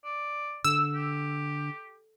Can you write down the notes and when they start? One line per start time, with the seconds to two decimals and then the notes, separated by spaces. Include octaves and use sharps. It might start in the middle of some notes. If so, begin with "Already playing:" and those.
0.04 D5
0.64 D3 E6
0.94 G4